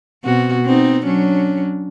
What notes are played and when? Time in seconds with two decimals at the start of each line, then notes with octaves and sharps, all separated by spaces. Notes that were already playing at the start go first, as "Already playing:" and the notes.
0.24 B2 C4 F#4
0.64 B3 C4 D#4
1.06 F#3 C#4 D4